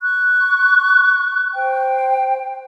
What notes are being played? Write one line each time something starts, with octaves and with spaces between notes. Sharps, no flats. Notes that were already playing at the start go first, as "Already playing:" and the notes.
C#6 F#6
C5 G5